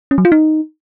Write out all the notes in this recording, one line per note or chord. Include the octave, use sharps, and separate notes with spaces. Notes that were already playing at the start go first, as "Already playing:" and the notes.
C#4
F#3
F4
D#4